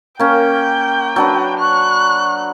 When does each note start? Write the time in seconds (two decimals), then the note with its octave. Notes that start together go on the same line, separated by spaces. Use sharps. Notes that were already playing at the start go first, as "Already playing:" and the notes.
0.20 A#3 C#4 G5
1.16 F#3 D4 B4
1.59 C#6 F#6